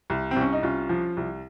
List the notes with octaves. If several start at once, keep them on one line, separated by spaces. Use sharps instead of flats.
C2
C4
C2 C#4
D#4
C2 C#4 F4
F3
C2